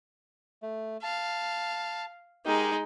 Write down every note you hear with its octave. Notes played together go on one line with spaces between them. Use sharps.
A3
F5 A5
G#3 D#4 G4 A#4